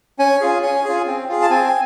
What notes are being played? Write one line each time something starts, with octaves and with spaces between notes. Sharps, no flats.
C#4 G#5
F4 G#4
C#4 G#5
F4 G#4
C4
F4 G#4
A5
C4 G#5